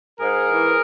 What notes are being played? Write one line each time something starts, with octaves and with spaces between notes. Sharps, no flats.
G#2 G#4 A#4
E3